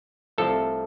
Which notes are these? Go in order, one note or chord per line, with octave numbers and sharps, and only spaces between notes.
C2 C3 F3 A3 A4